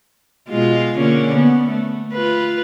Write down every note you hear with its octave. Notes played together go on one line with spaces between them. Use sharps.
B2 G#3 F4
D3 A#3 C#4
B3
A3
F4 B4